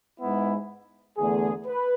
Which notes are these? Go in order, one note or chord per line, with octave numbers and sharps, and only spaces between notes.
G#2 G#3 B3 E4
E2 D3 A3 G#4
B4